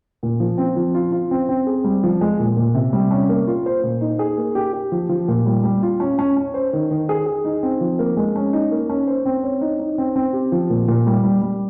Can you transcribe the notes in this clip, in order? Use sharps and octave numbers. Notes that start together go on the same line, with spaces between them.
A#2
F3
C4
F3
F4
F4
C4
C4
G#4
G3
F3
G#3
A#2
A#2
C3
G3
C#4
A#3
F4
C5
A#2
D#4
G#4
A#3
G4
G4
F3
F3
A#2
G3
G3
F4
C#4
C#4
C#4
C5
D#3
D#3
G#4
G#4
D#4
C4
F3
A#3
G#3
C#4
D#4
A#3
C#4
C5
C4
C#5
D#4
D#4
C4
C4
G4
F3
A#2
A#2
G3
G3
G3